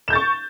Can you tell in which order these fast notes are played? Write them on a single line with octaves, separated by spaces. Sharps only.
E7 G6 A6 C#6